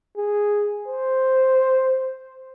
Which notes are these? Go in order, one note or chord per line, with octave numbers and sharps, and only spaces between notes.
G#4
C5